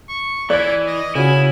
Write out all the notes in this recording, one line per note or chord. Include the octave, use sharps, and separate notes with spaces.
C#6
E3 E4 D5 F#6 G#6
D#5
C#3 C#4 E4 F#4 G#5